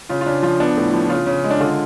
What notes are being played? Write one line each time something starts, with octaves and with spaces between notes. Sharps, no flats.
C#3 F4
F4
C#3 D4
F3 F4
B3 D4
A2
F3
C#3 F4
C#3
G#3
D4
D3 F4